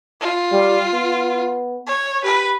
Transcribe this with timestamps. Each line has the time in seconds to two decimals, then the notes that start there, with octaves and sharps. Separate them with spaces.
0.20 F4
0.52 G3
0.93 B3
1.87 C#5
2.24 G4 B4